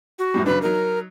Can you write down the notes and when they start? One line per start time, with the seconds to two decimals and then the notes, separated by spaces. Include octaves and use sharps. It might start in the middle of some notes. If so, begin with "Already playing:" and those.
0.19 F#4
0.34 F#2 A2 G3
0.46 C#3 F#3 D4 B4
0.62 F#3 D#4 A#4